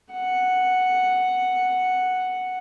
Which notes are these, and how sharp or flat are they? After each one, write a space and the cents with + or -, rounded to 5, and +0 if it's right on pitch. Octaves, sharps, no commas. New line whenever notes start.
F#5 +0